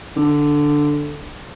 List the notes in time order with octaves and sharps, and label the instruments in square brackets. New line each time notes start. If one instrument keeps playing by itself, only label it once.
[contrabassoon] D3